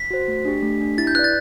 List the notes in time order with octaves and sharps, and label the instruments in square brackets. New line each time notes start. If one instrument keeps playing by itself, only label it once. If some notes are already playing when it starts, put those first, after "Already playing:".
Already playing: [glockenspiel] B6
[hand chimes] F#4 C5
A3
D4 G4
A3
D4 G4
[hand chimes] E4 [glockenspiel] A6
[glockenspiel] G6
[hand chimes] B4 D5 [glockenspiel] F#6
[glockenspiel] A6